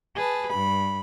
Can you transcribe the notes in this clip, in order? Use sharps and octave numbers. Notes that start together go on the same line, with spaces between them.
G#4 B4 A5
G2 B5